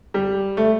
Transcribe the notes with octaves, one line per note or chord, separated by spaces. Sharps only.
G3
A3